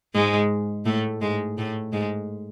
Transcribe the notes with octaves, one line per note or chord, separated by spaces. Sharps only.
G#2 G#3
A2 A3
G#2 G#3
A2 A3
G#2 G#3